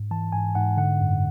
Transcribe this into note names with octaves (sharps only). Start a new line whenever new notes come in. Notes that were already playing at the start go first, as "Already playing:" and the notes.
Already playing: G#2
E3 A5
G#2 G#5
G#2 F#5
D3 F#5
F#2